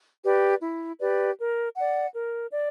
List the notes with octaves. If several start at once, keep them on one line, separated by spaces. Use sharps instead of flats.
G4 B4 D5
E4
G4 B4 D5
A#4
D5 F#5
A#4
D5